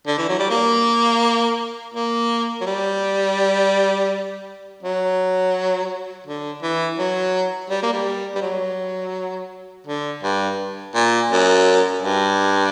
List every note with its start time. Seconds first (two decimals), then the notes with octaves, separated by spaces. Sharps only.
0.07 D3
0.18 E3
0.29 F#3
0.39 G3
0.50 A#3
1.94 A#3
2.61 F#3
2.66 G3
4.83 F#3
6.26 D3
6.62 E3
6.99 F#3
7.70 G3
7.83 A#3
7.93 G3
8.35 G3
8.42 F#3
9.87 D3
10.23 G2
10.95 A#2
11.31 F#2
12.02 G2